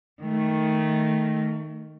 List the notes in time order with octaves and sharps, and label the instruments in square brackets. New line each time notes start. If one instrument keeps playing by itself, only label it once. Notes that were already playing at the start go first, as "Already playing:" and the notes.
[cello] D#3 A3